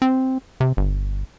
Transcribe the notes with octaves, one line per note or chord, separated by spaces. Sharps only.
C4
C3
G1